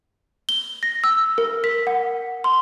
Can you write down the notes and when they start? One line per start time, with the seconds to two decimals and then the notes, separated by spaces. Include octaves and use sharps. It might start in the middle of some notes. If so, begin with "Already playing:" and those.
0.49 G7
0.83 A#6
1.04 E6
1.38 A#4
1.64 B6
1.87 F#5
2.44 C6